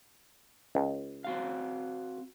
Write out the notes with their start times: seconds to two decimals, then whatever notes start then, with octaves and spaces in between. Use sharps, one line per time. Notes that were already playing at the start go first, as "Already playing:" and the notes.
0.75 C#2
1.24 C4 F#4 F5